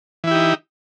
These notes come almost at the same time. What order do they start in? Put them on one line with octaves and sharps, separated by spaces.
E3 E4 G4 D#4